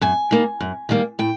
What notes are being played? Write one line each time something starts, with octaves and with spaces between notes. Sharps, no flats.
F#2 G#5
D#3 G3 A#3
F#2
D#3 G3 A#3
A2 G5